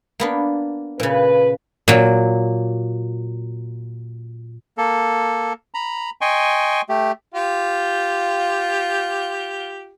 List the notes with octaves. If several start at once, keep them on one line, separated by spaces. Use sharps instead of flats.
A#3 B3 D4
A#2 C#3 B4
A#2 F#3
A#3 A4
A#5 B5
D#5 G5 G#5 C6 C#6
A3 G4
F4 G4